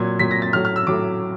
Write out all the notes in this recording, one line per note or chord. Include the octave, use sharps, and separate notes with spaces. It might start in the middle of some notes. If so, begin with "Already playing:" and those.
Already playing: A#2 F#3 G#6
A#2 F#3 B6
A#6
A6
A2 F#3 F6
F6
E6
A2 F#3 D6